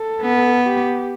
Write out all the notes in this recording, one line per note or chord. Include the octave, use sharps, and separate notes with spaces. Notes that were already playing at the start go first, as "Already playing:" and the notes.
Already playing: A4
B3
G4